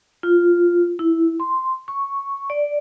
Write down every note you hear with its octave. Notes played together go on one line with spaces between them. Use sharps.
F4
E4
C6
C#6
D5